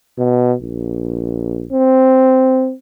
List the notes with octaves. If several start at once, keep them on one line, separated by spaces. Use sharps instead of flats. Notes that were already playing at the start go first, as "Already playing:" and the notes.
B2
A#1
C4